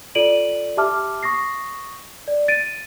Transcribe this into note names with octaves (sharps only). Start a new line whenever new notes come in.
F4 A4 D5 D7 D#7 F#7
G4 E5 A5 D6 F6
C#6 D#6 A#6 C7
D5
A6 D7 D#7